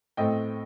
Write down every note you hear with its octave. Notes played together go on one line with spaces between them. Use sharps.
A2 A3 C4 D#5 G5